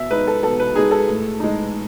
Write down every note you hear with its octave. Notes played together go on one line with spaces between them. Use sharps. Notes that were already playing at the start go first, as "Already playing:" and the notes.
Already playing: B2 E5
G#3 D#4 B4
A4
B2 A4
B4
G#3 D#4 G#4
A4
A2
G#3 D#4